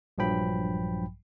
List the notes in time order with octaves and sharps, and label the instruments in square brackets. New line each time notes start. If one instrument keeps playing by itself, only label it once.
[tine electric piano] A#1 G2 F3 F#3 G5 B5